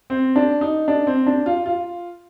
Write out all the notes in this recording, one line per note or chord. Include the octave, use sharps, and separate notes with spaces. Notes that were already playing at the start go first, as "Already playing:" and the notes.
C4
D4
D#4
D4
C4
D4
F4
F4